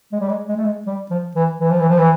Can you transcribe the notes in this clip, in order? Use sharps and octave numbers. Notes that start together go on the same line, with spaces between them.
G#3
G3
G#3
G#3
A3
G#3
G3
F3
E3
E3
F3
E3
F3
E3